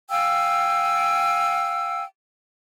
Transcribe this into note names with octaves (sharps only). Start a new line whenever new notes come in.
F5 G5 G#5 E6